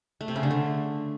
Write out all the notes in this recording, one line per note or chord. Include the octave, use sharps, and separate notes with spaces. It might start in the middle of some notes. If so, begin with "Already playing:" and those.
A3
C3
C#3
D3
A3